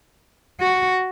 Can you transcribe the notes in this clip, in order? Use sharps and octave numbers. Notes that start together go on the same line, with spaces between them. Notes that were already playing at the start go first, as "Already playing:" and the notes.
F#4